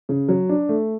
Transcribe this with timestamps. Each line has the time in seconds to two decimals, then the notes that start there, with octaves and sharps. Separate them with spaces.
0.09 C#3
0.28 F#3
0.49 D4
0.69 A3